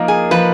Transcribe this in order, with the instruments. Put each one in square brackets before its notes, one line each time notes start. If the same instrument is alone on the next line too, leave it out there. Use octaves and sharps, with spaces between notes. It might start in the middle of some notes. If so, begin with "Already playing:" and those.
Already playing: [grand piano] F3 A#3 D#4 A#4
[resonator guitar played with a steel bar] G#4
[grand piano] F3 [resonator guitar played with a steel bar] B4